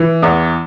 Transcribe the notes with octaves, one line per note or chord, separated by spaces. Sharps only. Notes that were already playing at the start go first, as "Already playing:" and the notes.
Already playing: E3
E2